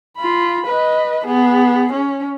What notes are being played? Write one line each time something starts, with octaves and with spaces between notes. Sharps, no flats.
F4 B5
B4 D#5
B3 G#4
C#4